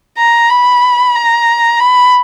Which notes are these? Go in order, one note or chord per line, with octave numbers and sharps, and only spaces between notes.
A#5
B5
A#5
B5